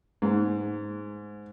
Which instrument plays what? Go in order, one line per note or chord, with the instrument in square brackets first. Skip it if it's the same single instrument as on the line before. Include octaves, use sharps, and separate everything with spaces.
[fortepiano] G#2